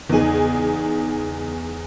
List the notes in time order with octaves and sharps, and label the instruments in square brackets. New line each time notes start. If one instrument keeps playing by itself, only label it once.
[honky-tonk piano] E2 G#4 [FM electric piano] C#3 D#4